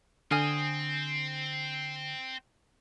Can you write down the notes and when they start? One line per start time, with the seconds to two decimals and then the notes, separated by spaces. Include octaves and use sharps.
0.31 D3 C4 G#5 D#6 F6